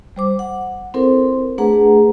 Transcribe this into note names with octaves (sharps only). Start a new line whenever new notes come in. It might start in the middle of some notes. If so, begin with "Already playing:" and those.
G3 C5 D6
F#5
C4 E4 A4 A#4 C5
A3 D4 G#4 B4 F#5 A#5